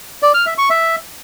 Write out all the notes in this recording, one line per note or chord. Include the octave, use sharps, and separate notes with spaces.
D5
F6
E5
C#6
E5